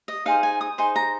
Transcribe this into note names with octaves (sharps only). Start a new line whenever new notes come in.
D#5
D#4 G#4 C5 F5
G#5
D#6
D#4 G#4 C5 C6
A#5